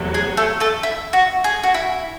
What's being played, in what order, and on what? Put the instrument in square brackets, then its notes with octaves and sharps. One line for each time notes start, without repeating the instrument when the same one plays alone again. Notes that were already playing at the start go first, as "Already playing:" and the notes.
Already playing: [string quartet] E2 C3 F#3 A3
[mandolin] G#4
A3 A4
A3 A4
E4
F#4
G#4
F#4
E4